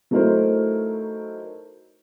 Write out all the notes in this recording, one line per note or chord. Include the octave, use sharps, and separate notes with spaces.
F#3 A3 D#4 E4 A#4 C5